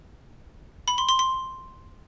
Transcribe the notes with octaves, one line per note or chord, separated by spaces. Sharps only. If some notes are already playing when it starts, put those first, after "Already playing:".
B5
C6
C6
C6